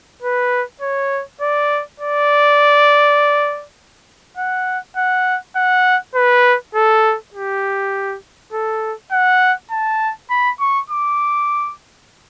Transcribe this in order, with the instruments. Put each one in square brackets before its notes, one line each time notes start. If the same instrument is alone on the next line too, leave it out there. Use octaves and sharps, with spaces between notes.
[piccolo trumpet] B4
C#5
D5
D5
F#5
F#5
F#5
B4
A4
G4
A4
F#5
A5
B5
C#6
D6